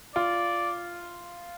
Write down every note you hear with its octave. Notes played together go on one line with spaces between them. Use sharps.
F4 D5